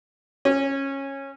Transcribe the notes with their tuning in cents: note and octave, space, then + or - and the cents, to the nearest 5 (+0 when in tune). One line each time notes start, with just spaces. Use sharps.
C#4 -15